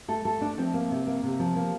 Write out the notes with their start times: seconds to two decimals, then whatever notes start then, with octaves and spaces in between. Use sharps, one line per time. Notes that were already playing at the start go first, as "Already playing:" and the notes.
0.08 A3 A4
0.25 A3 A4
0.41 A3 D4
0.57 F3 C4
0.74 A#3
0.91 C3
1.07 A#3
1.23 C3
1.39 F3
1.55 A#3